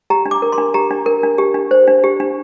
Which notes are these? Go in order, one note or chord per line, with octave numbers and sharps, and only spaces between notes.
G4 A#5
D4
D6
A#4
C6
D4
G4 A#5
D4
A#4
D4
G4
D4
C5
D4
G4
D4